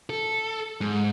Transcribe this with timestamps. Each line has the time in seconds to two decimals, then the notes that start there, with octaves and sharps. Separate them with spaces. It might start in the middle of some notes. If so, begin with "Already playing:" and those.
0.10 A4
0.81 G#2